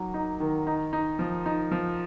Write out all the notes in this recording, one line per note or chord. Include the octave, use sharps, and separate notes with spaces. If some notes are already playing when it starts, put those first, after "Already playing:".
Already playing: F#3 A#3 D#4
D#4
D#3
D#4
D#4
F3
D#4
F3